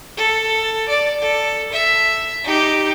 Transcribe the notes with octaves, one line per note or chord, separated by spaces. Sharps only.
A4
D5
A4
E5
D#4 G4